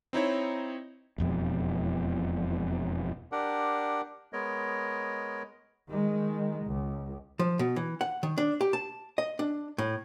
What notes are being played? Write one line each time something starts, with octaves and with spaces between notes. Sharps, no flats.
C4 D#4 E4 C#5
E1 F2 B2 G3
D4 G4 A#4 F#5
G#3 B3 A#4 C#5 D#5
D#3 G#3
C#2
F3
B2
E3
F#5
D#3
D4
G4
A5
D#5
D4
A2